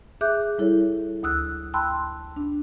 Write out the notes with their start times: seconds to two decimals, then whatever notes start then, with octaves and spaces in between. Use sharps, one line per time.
0.21 G#4 E5 D6 F#6 G6
0.58 G3 E4 A4 C#5
1.23 D2 D#6 E6 F#6
1.74 G5 A5 B5 C6 E6 F#6
2.36 D4